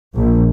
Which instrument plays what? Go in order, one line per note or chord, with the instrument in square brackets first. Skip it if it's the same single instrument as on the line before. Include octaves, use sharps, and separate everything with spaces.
[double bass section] A#1